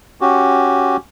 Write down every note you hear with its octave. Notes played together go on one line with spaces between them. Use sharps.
C#4 F#4 G4